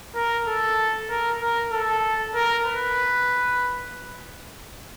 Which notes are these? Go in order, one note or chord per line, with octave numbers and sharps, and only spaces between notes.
A#4
A4
A#4
A#4
A4
A#4
B4